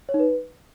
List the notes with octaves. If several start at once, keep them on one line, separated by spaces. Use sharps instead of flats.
C#5
D#4
B4